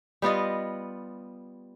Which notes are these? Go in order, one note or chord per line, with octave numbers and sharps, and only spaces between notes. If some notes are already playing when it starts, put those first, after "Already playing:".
G3 B3 F4 D#5